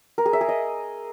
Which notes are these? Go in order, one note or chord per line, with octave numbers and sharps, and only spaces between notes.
A#4
G#4
E5
G#4
D#5